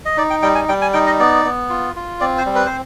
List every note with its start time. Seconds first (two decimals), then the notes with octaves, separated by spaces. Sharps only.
0.05 D#5
0.17 D#4 D5
0.30 G5
0.42 G3 G5
0.55 G#5
0.69 G3 G5
0.82 G#5
0.93 D#4 G5
1.07 D#5
1.19 B3 D5
1.45 B3
1.70 F4
1.96 F4
2.20 C4 D5
2.38 C5
2.46 G3
2.55 B4
2.66 C5